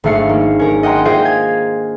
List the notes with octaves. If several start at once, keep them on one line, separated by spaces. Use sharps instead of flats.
G#1 A3 D4 F5 F6 C#7
A#3
C#4 A#4
D#5 F#5 G5 A#5 C6
F4 G#4 C5 D#5 F5 G5
G#6